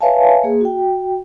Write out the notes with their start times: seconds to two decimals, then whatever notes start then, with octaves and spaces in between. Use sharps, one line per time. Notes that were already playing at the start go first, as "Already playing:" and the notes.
0.01 B4 C#5 E5 F5 G#5 A5
0.43 A#3 G#4
0.61 F#4 G5